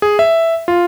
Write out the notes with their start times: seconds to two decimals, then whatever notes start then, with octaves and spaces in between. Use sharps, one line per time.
0.02 G#4
0.19 E5
0.68 F4